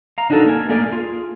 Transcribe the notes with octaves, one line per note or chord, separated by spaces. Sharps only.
F5 A#5
D4 D#4 F#4 G4 A4 A#4
A#3 A#4 G#5
A3 A#3 G#4 A#4 D5
F4 G#4